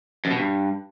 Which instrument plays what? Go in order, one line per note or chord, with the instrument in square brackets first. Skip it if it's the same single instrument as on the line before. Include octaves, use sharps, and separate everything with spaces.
[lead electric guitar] F#2
B2
G2